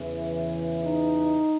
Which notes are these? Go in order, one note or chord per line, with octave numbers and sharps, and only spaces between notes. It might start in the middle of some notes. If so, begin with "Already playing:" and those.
Already playing: E2 C#3 E3
D#4